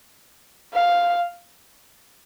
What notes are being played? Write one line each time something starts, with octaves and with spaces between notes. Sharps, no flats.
F5